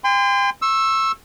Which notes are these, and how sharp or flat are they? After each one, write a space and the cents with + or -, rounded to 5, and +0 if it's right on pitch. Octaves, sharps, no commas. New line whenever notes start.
G5 +40 C6 -30
C#6 -35 E6 +0